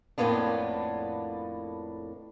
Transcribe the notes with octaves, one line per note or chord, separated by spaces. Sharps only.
F2 A2 A#3 B3 D4